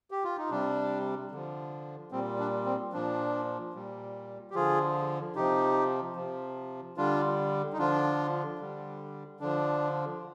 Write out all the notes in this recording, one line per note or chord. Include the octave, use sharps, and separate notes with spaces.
G4
F4
D#4
C3 G3 D4
D3 F3
A#2 G3 C4
D4
C4
A#2 F3 D4
A#2 G3
G4
D3 F3 F4 G#4
C3 F3 D#4 G4
C3 F3
D3 G3 D4 F4
D#4
D3 F3 D4 F4
D3 G3
D3 F3 D4